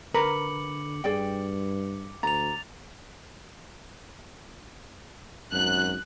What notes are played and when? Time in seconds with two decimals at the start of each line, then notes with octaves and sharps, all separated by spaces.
0.14 D3 A#4 B4 A#5 D6 C#7 F#7
1.04 G2 G#4 D5 G5
2.23 D2 A#5 A6 F7
5.53 G#1 F#2 F#6